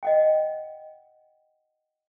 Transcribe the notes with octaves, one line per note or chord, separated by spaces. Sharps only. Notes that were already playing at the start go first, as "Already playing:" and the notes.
D#5 F#5 G5